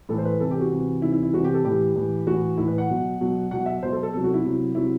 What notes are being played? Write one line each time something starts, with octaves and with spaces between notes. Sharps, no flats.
A2 E3 A4
C5
B4
C3 E3 A4
G4
F#4
C3 E3
C3 E3 E4
E4
E4
C3 E3 F#4
G4
A4
A2 E3 G4
A2 E3
A2 E3 F#4
A2 E3 E4
B4
F#5
B2 F#3
B2 F#3
B2 F#3 F#5
E5
B2 F#3 C5
A4
A4
C3 F#3 A4
F#4
E4
C3 F#3
C3 F#3 E4